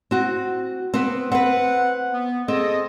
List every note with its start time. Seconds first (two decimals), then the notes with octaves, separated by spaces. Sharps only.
0.11 C4 F#4
0.94 B3 C4
1.32 C4 B4 F#5
2.12 B3
2.48 C4 G#4 A4 D#5